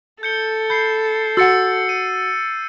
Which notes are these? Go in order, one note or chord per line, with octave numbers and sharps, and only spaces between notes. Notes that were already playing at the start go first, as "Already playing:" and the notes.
A4 G6 C#7 G7
B5 G6 C7
F#4 F#5 E6 A6 C#7
D#7